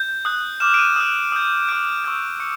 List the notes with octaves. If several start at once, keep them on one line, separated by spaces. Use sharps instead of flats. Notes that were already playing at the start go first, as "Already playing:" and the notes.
Already playing: G6
D#6 F#6
D6 F6 E7
D7
D#7
D#6 F#6 E7
D#6 G6
D6 F#6 D7
C#6 E6 G6
C#6 C#7